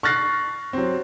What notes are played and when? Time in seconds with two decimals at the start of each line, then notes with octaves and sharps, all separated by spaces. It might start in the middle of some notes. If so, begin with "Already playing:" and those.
0.03 C#6 F6 F#6 A6 A#6 C7
0.73 F#3 C4